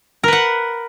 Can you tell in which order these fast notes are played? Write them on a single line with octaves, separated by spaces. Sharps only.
A#4 B4 F#5